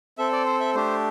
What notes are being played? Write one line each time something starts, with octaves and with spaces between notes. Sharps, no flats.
C4 A4 E5
D5
C5
E5
A3 D4 G4 C5